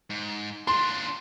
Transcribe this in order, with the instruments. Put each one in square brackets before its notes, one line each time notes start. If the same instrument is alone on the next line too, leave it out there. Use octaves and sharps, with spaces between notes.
[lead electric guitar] G#2
[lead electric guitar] D4 F4 [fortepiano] C6